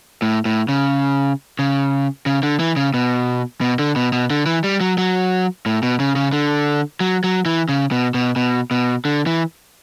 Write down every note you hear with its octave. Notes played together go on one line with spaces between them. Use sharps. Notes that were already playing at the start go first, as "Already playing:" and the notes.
A2
A2
C#3
C#3
C#3
D3
E3
C#3
B2
B2
D3
B2
B2
D3
E3
G3
F#3
F#3
A2
B2
C#3
C#3
D3
F#3
F#3
E3
C#3
B2
B2
B2
B2
D3
E3